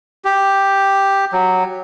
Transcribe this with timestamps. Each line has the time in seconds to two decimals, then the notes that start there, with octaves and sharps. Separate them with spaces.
0.25 G4
1.33 F#3